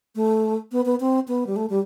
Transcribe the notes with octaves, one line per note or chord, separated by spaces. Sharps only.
A3
B3
B3
C4
B3
G3
A3
G3